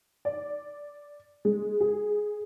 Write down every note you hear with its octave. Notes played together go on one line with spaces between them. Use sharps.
D5
G#3
G#4